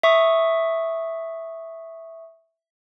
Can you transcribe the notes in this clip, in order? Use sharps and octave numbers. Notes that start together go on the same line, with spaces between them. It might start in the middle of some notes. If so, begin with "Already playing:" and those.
E5 C#6 D#6